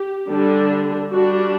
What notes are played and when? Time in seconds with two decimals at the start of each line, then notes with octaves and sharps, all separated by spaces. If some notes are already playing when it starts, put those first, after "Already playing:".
Already playing: G4
0.29 D3 G3 D4
1.11 G3 D4 F#4